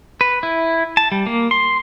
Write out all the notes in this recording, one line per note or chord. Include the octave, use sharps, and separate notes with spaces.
B4
E4
A5
G3
A#3
C6